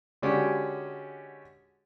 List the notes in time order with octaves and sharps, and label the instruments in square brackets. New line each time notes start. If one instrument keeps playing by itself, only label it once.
[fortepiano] D3 G#3 C#4 D4 F#4 G4